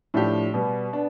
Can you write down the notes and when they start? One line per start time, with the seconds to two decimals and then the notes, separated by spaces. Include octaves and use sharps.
0.14 A2 F3 A3 D4 G4
0.54 B2 G3 B3
0.93 B3 D4